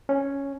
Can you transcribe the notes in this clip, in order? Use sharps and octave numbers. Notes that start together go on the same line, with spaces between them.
C#4